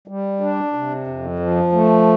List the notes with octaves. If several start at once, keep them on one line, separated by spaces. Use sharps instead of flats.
G3
D4
C3
F2
F3
A3